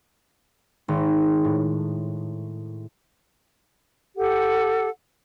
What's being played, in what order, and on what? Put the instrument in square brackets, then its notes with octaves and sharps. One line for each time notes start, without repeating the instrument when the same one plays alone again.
[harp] G#1
A2
[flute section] G4 A4 F#5